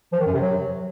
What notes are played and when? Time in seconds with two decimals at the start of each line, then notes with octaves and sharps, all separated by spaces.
0.13 F3
0.20 D#3
0.27 F#2
0.34 C3
0.41 F#3